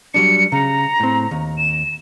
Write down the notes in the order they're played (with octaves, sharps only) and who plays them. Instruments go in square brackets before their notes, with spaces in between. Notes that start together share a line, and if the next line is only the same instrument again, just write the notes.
[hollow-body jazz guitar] F#3 G3 D4 [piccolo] C#7
[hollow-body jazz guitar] C#3 [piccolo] A#5
[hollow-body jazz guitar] A2 C4
D#2
[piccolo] E7